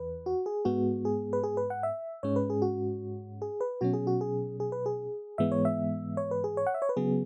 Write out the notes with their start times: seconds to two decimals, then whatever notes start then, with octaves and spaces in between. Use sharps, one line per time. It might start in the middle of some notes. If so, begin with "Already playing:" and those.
Already playing: E2 E3 B4
0.26 F#4
0.46 G#4
0.65 G#2 G#3 B3 F#4
1.05 G#4
1.33 B4
1.43 G#4
1.57 B4
1.70 F#5
1.83 E5
2.23 G#2 G#3 C#4 C#5
2.36 B4
2.50 G#4
2.62 F#4
3.42 G#4
3.61 B4
3.81 B2 F#3 C#4 F#4
3.93 G#4
4.07 F#4
4.21 G#4
4.60 G#4
4.72 B4
4.86 G#4
5.38 G#2 E3 G#3 B3 E5
5.52 C#5
5.65 E5
6.17 C#5
6.31 B4
6.44 G#4
6.57 C#5
6.67 F#5
6.74 E5
6.82 C#5
6.89 B4
6.96 C#3 F#3 B3 G#4